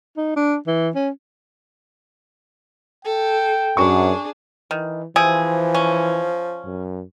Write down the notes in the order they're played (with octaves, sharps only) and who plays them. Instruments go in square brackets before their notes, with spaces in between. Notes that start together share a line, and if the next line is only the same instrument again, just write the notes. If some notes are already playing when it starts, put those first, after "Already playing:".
[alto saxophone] D#4
D4
E3
C#4
[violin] A4 [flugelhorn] G5
[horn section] F#2 [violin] D4 G#4 [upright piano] C#6
[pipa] D#3 [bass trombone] E3
[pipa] C3 G#4 [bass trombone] E3 [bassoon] F3
[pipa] C#4
[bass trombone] F#2